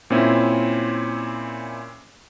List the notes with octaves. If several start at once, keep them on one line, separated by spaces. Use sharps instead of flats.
A#2 C4 C#4 E4